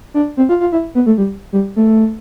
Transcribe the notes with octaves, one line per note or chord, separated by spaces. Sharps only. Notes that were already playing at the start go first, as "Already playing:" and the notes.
D4
C4
F4
F4
E4
B3
A3
G3
G3
A3